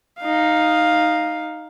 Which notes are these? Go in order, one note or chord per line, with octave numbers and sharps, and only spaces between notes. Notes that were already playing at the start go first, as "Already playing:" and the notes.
D#4 F5